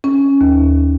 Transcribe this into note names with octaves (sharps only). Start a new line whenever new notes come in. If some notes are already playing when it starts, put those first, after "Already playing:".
C#4
D#2